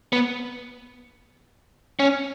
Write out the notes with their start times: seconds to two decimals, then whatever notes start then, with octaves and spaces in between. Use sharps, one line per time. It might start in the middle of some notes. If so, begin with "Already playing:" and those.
0.13 B3
2.00 C#4